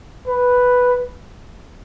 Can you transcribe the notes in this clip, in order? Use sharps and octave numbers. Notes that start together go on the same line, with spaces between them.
B4